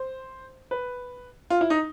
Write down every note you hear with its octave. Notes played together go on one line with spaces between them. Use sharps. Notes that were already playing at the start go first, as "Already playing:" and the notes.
Already playing: C5
B4
F4
E4
D#4